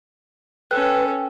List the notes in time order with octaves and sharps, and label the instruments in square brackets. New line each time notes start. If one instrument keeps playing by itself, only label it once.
[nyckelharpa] C#4 A4 [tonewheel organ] B4 [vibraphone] G5